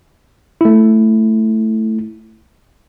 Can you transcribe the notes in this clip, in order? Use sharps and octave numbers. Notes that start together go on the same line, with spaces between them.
A3 E4